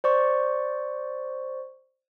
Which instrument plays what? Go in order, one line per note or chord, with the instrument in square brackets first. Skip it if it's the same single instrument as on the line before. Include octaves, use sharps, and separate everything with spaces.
[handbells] C5 D5 C#6